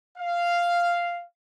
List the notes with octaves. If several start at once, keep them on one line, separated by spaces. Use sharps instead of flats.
F5